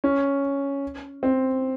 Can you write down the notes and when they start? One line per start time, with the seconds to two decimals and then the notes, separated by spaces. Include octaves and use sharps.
0.04 C#4
1.23 C4